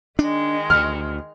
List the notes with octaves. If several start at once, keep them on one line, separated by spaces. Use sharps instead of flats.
D#3 G#3 D4
D2 F6